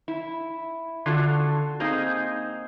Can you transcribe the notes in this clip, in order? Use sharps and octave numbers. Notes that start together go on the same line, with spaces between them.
E4
D3 F4 F#4 A4
A#3 C4 D#4 G#4